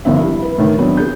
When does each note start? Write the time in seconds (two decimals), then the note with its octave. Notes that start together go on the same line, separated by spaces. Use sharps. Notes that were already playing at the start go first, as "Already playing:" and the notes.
0.05 G1 D#3 F3 B3 C4 E5
0.21 G3 E4
0.42 B4
0.58 A2 D#3
0.78 F#3 B3 C4 D4
0.97 G#4 G6